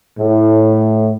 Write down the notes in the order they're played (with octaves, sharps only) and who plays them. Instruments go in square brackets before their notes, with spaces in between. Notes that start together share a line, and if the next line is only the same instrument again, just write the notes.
[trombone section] A2